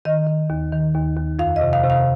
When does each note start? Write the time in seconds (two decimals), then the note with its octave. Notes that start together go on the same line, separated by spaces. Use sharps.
0.05 D#3 D#5
0.27 D#3
0.50 D#2
0.73 D#3
0.94 D#2
1.17 D#2
1.39 F2 F5
1.56 D#5
1.61 C3
1.73 F5
1.84 C3
1.90 F5